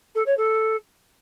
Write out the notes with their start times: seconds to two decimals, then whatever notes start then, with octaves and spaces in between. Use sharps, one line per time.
0.15 A4
0.26 C#5
0.37 A4